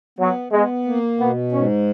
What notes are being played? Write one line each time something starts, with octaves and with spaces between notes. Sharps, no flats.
F#3 B3
G#3 B3
A#3
B2 B3
G#2 C#4